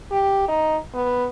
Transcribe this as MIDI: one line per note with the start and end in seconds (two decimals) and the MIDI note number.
0.12 0.46 67
0.48 0.76 63
0.95 1.27 59